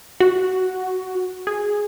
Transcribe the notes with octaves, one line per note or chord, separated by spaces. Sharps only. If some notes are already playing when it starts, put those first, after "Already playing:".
F#4
G#4